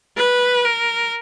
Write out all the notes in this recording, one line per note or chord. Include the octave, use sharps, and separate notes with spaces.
B4
A#4